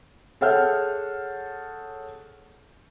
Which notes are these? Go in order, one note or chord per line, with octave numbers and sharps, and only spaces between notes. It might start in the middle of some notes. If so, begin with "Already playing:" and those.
G#4 A4 C#5 F#5 F6 G6